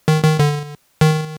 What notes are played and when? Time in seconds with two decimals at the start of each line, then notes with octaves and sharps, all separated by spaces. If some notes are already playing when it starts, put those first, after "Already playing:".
0.08 D#3
0.23 D#3
0.39 D3
1.01 D#3